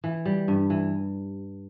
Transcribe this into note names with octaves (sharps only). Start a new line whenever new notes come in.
E3
G3
G2
E3